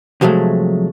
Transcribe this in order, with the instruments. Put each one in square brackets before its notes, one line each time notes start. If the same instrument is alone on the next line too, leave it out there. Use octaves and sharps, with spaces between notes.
[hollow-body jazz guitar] C3 F3 F#3 G#3 A3